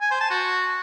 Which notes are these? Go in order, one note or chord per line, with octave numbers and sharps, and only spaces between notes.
G#5
C5
A5
F#4